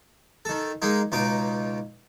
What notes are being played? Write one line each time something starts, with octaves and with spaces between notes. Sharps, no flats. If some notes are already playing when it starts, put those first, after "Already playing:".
D#3 A4
G#3 A#3 D#4
C#2 B2 D#4 D6